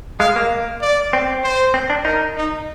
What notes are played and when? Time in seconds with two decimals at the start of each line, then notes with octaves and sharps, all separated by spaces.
0.20 G#3 F5
0.36 A#3
0.81 D5
1.13 C4
1.44 C5
1.74 C4
1.90 D4
2.05 D#4 A#4
2.36 D#4